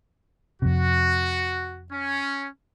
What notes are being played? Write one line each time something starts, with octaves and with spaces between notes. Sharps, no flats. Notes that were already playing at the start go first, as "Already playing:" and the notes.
F2 C3 F#4
C#4